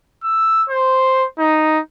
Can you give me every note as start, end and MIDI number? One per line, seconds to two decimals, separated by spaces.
0.24 0.64 88
0.70 1.25 72
1.39 1.80 63